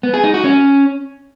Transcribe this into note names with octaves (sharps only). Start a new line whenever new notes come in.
B3
G#4
D#4
F#4
C#4